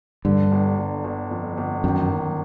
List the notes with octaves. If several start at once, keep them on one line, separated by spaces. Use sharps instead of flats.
G2 D3
G1
G1
G1
F2
G1
F#2 D#3
D#3